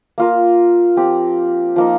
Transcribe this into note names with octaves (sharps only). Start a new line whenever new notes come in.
A#3 F4 A#4
F3 C4 G4
F3 A#3 D#4